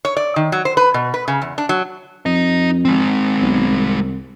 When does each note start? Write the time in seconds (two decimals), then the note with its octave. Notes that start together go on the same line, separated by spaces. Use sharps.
0.05 C#5
0.17 D5
0.36 D#3
0.52 F#3
0.65 C5
0.77 B4
0.94 B2
1.14 B4
1.28 C#3
1.42 E2
1.58 D4
1.69 F#3
2.26 F2 D#4 D#5
2.85 G#3 C4
3.42 B1
3.70 C2